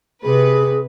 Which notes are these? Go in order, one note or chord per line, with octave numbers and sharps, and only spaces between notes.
C3 G#4 B4